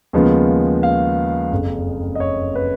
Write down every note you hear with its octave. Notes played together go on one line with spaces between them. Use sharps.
D#2 C#3 F3 G#3 B3
F5
F#1 F2 C#3
D#5
C#5
B4